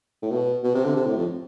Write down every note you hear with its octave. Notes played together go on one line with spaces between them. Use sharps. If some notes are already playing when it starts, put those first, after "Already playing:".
A2
B2
B2
C3
D3
C3
A2
F2